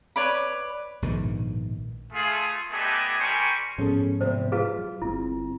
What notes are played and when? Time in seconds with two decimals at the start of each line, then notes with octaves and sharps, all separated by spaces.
0.16 B4 C#5 D5 B5
1.02 A#1 G#2 B2 D#3
2.13 A3 F4 G#4
2.72 A3 B3 D4 G4 D#5 G#5
3.20 G3 A#4 C5 G#5 C#6
3.78 G#2 F3 B3 C#4 G#4 A4
4.21 E2 C3 C4 C5
4.52 F4 G#4 B4 F5
4.78 F#3
5.02 G1 C4 E4